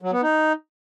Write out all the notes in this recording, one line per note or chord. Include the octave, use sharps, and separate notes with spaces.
F#3
B3
D#4